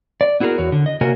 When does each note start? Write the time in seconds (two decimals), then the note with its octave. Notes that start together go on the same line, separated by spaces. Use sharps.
0.21 D5
0.40 B3 E4 F#4 G#4 A#4
0.58 E2 F#4 C#5
0.72 D3
0.86 D#5
1.01 C3 A#3 F#4 A#4 C#5 G#5